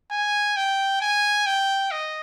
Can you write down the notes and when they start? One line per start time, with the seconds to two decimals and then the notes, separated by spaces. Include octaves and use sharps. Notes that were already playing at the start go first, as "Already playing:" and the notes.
0.12 G#5
0.56 G5
1.01 G#5
1.46 G5
1.91 D#5